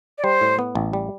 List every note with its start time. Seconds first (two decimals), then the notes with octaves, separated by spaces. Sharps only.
0.18 D5
0.24 G3 C5
0.41 A2
0.59 B3
0.75 A1
0.93 G3